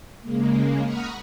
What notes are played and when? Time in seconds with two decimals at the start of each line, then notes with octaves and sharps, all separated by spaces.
0.22 C#3 G#3 A#3
0.82 F#5 A#5 B5 C#6 D#6 F6